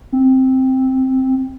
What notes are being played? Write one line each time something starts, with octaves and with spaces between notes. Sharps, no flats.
C4